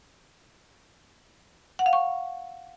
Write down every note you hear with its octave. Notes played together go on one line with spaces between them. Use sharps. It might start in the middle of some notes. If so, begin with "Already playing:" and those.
F#5
F5
C#6